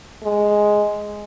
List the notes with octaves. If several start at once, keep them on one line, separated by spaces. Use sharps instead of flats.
G#3